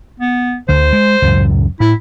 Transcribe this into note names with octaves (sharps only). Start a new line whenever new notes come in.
B3
D2 D3 C5
G#3
C#2 F#2 A2
A2 E4